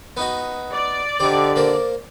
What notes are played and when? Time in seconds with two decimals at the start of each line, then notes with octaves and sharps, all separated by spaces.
0.17 B3 D#4 F#4
0.73 D5
1.20 D3 D#4 G4 C5
1.56 A#3 C5